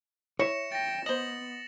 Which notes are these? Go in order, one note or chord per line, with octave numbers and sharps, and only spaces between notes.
E4 C#5 A#6 C#7 E7
G5 A6 A#6
B3 C5 D#5 A#6 E7 F#7